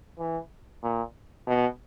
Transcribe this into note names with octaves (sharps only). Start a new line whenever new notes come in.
E3
A#2
B2